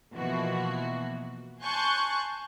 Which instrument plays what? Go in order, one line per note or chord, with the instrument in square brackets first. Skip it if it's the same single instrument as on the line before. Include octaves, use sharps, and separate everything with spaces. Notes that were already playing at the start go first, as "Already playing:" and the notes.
[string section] B2 E3 F3 A#3 F#4
G#5 A5 C6 C#6 F#6 G6